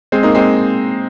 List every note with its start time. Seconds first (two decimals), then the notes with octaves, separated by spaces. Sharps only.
0.12 G#3 C4
0.23 A#3 D#4
0.34 G#3 C4